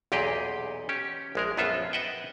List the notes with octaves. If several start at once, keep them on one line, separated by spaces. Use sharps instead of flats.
B1 E2 A#2 G4 G#4 D#5
C#4 G4
A#1 G#3 A#4
A#1 F#2 B3 F4 A4 E5
B4 D#5 E5 F#5 G5